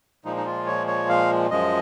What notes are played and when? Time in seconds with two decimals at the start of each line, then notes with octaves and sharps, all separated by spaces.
0.25 A#2 F3 G#3 D#4
0.37 D#4
0.46 F4
0.66 C#5
0.87 C#5
1.09 F5
1.50 F#2 F3 G#3 D#5